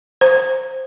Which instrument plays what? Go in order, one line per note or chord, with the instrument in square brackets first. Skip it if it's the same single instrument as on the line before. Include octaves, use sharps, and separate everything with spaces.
[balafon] C5